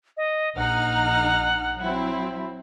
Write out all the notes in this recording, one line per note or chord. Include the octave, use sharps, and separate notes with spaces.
D#5
A#1 D#4 F#5 F6
F#3 C4 E4